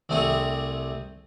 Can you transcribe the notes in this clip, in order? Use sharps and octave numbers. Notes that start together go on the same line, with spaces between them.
C2 C3 A3 C4 G#4 C#6